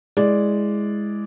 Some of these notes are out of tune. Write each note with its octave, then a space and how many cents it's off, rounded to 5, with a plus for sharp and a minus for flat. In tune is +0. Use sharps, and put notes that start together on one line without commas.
G#3 +0 E4 -5 D5 -5